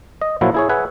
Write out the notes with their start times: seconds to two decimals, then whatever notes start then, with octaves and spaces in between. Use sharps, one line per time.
0.22 D#5
0.41 A#2 F3 F#3 E4 F#4
0.54 E4 G#4 C#5
0.69 G#4 B4 E5 F#5 G#5